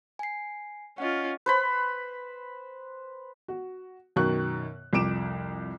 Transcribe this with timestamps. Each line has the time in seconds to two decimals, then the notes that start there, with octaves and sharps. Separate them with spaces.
0.19 G#5 C7
0.98 C#4 F4 D#5 F#5
1.46 B4 C5 B5
3.48 F#4
4.16 F#2 B2 D#3 A#4 C#6 F#6
4.93 C2 F2 D6 D7 E7